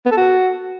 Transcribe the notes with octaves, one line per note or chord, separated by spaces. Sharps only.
B3
A4
F#4